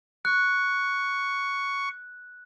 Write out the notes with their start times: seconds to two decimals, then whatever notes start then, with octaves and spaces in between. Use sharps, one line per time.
0.25 C#6 F#6